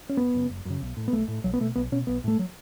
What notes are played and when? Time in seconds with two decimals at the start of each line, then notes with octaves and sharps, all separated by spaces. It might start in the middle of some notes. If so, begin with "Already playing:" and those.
0.09 C#4
0.17 F#1 B3
0.34 F#2 C#3
0.49 F#1
0.65 F#2 C#3
0.82 B1
0.97 A2
1.08 B3
1.12 B1 A3
1.28 A2
1.44 B1 F#3
1.54 B3
1.60 B2 A3
1.76 B1 B3
1.92 B2 C#4
2.07 B1 B3
2.24 A2 A3
2.39 F#3